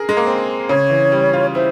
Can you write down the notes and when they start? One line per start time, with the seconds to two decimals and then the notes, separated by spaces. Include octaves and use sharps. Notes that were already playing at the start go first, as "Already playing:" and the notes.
Already playing: G#4 A#4
0.09 G#3
0.17 A#3
0.26 C4
0.69 C#3 C#5
0.90 E3
1.12 G3
1.33 F4
1.55 E4 C5